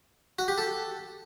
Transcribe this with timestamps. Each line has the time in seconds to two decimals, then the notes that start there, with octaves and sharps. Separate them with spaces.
0.39 F#4
0.48 G4
0.58 A4